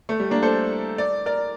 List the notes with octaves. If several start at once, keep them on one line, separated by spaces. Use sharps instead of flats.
A3
G3
A#3 D4
A4 C5
D5
A#4 D5